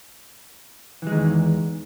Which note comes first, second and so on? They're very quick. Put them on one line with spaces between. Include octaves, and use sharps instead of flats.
E3 G#3 D#3 E2